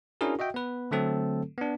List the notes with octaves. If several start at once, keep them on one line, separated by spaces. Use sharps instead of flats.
C#4 D4 E4 F#4 G#4 A#4
F#4 D#5 E5 G5
B3 B4
D3 F#3 A3 C4 A4
B3 D4